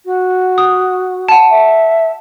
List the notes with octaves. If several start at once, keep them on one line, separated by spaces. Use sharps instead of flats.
F#4
D#6
F#5 A5
E5